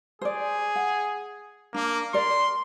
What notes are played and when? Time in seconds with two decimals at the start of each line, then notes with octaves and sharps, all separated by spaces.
0.22 G#4 C5 D5
0.76 F#5
1.74 A#3 D4
2.14 A#4 D5 C6